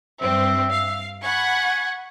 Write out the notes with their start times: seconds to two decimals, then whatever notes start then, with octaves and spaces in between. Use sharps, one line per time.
0.21 G2 C4 E5
0.71 F5
1.23 F#5 G#5 B5 C#6